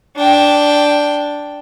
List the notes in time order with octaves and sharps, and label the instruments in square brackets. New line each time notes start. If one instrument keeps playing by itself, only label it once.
[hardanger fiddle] D4 G5